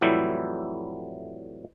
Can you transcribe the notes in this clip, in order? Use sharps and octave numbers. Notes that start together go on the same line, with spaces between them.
F2 A2 E3 F#3 G3 E4